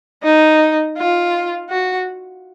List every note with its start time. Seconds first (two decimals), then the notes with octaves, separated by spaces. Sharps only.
0.23 D#4
0.97 F4
1.70 F#4